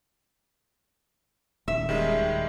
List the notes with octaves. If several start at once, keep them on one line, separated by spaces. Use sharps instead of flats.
D#1 E5
D#3 G3 G#3